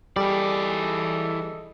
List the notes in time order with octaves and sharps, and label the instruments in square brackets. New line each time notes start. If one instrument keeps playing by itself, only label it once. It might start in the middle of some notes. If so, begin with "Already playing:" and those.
[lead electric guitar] E3 D5 [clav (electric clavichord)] G3 [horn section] G#4 A4 D#5